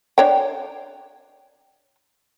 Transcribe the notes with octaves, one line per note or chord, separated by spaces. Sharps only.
D4 C#5 G5